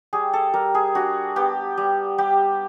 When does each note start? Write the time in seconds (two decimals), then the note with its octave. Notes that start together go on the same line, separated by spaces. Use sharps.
0.13 G3 G#4
0.33 A4
0.54 G3 A#4
0.75 G#4
0.95 D4 F#4
1.36 B3 G4
1.78 G3
2.18 G3 G4